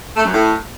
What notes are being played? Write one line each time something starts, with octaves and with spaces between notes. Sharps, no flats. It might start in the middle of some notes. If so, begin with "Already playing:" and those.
A3
F#2
A2